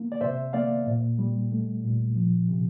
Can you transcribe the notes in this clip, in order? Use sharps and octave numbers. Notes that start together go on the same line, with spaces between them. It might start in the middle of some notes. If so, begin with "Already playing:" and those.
Already playing: A#3
D5
C3 C5 E5
A#3 D5 F5
A#2
G3
A3
A#2
F3
C3